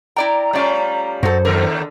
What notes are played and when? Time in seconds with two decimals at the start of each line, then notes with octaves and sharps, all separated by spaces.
0.16 E4 D5 G5 A#5
0.53 G3 A3 C#4 F4 D5
1.23 F#2 F#3 A4 C5
1.45 D#2 D3 A4 A#4